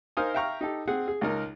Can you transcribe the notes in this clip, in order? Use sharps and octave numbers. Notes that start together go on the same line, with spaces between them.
D#4 A#4 C5 F5 G#5 D#6
E5 F5 G5 A#5 C#6 F6
D#4 G4 A4
C4 G#4 F#5
G#4
C#2 G#3 D#4 A#4